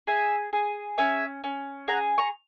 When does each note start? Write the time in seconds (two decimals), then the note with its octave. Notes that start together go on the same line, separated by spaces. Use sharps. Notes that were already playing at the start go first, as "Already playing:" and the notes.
0.07 G#4 E5 G#5
0.53 G#4
0.98 C#4 E5 G#5
1.44 C#4
1.88 G#4 F#5 A#5
2.18 A#5 C#6